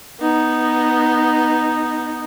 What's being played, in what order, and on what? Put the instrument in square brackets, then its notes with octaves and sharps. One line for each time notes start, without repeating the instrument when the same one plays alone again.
[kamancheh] B3 D#4